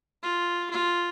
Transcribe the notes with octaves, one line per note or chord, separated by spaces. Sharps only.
F4
F4